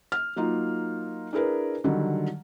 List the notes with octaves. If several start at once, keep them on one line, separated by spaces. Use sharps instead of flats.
F6
F#3 A#3 D#4 F4
D4 E4 G#4 A#4 B4
D3 D#3 F#3 G3